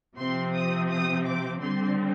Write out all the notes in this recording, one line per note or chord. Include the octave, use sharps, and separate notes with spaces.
C3 F3 C4 C6
D#6
D#6
D6
D3 G3 C4 C6